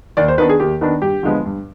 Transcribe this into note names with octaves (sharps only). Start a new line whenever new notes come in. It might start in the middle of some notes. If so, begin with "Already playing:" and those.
D#2 D5
C5
D#3 B3 D4 B4
G#4
D#2 G4
D#3 B3 D4
G2 G4
D3 F3 G#3 B3
G2